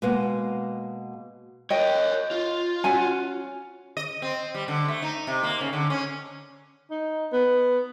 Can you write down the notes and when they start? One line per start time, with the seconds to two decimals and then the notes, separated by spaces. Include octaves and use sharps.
0.02 B2 G#3 A#3 B4 F#5
1.70 A#4 C#5 D#5 G5
2.31 F4
2.84 C#4 F#4 G#5
3.97 D#5
4.22 C4
4.54 G3
4.68 D3
4.88 A3
5.02 D#4
5.27 C3
5.43 A#3
5.61 C#3
5.73 D3
5.90 C#4
6.91 D#4
7.32 B3